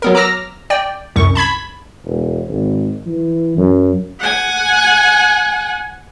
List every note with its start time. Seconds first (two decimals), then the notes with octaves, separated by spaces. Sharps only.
0.02 F#3 B3 A#4
0.15 A#5 D6 E6 F6 A#6
0.70 D5 G5
1.16 C2 F#2 C#6
1.35 A5 B5 G#6 B6
2.05 E1
2.49 G#1
3.06 E3
3.57 F#2
4.20 F#5 G#5